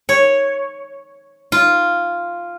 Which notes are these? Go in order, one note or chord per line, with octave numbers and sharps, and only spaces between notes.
C#5
F4